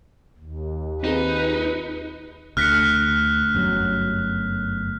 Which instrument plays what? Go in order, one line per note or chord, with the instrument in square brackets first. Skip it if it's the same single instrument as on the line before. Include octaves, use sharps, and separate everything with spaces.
[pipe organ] D#2
[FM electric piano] C4 F4 G#4 [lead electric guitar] D#4 [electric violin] B4
[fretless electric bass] D2 [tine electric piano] A3 A#6 C#7 [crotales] F6 F#6 B6
[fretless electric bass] G1 F#2 F#3